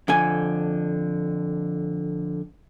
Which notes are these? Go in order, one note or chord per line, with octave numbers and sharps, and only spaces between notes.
F2 D3 G#5